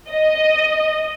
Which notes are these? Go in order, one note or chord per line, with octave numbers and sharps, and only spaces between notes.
D#5